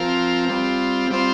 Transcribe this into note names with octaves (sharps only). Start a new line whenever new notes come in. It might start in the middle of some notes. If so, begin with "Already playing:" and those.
Already playing: F3 C4 F4 A#4
G3 C4 F4
G3 C4 F4 C5